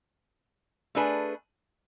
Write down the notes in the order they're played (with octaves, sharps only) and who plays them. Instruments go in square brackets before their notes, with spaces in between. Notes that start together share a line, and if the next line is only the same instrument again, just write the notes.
[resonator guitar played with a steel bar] A3 D4 G#4 B4